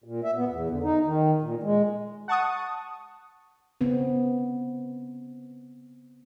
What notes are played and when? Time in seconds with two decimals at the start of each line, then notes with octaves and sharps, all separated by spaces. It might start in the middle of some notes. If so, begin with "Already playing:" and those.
0.04 A#2
0.24 E5
0.36 B3
0.49 E2
0.70 D3
0.83 D#4
1.05 D#3
1.42 A#2
1.63 G#3
2.28 F#5 A5 C#6 D#6
3.81 C#3 B3 C4